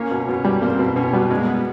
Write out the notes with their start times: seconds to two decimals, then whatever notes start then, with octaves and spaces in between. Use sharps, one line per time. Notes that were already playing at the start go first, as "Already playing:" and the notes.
Already playing: A#3 C#4
0.11 B2
0.29 B2
0.45 G3
0.62 A#3 C4
0.79 B2
0.96 B2 C#4
1.13 G3 B3
1.30 G#3 B3
1.39 A#3
1.47 B3